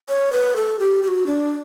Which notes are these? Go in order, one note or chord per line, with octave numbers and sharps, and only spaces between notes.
C#5
B4
A4
G4
G4
F#4
D4